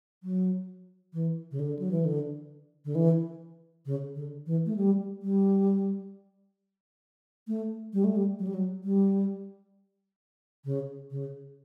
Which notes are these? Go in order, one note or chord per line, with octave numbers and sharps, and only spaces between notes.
F#3
E3
C#3
D3
F#3
E3
D3
D3
E3
C#3
D3
E3
A3
G3
G3
A3
G3
A3
G3
F#3
G3
F#3
G3
C#3
C#3